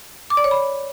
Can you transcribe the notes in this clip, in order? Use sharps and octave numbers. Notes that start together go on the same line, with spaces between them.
D6
D5
C#5
B5